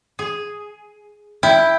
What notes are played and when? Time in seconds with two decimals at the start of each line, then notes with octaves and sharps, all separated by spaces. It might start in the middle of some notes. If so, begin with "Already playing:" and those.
0.19 G#4
1.43 E4 G5